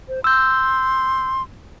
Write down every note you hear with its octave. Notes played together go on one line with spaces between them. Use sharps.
C5
C6 E6 G6